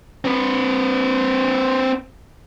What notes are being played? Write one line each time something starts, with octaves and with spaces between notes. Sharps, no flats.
C4 B4